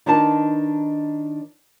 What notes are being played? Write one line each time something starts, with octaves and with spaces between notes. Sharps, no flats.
D#3 D4 D#4 B4 A5